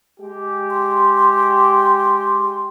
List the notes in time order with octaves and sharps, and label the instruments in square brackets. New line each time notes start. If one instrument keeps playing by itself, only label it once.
[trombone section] G#3 G4
[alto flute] C6